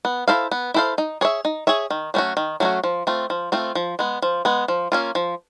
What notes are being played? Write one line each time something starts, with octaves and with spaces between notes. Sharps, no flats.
B3
E4 A4 C5 F5
B3
E4 A4 C5 F5
D#4
G#4 C#5 E5
D#4
G#4 C#5 E5
D#3
F#3 A3 C#4 F#4
D#3
F#3 A3 C#4 F#4
F3
A3 C4 F4
F3
A3 C4 F4
F3
G#3 B3
F3
G#3 B3
F3
A#3 C#4 F4
F3